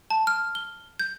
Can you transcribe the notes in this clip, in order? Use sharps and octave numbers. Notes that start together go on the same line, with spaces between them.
A5
F6
G7
G6